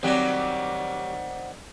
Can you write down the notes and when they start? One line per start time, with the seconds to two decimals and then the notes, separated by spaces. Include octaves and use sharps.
0.03 D#3 F#3 G3 C4 D4 G4 C5 F#5